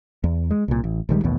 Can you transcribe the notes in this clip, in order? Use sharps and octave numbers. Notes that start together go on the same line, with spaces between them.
E2
G#3
C2 A#2
A1
A#1 D#3 G3 G#3
A1 D#2 B2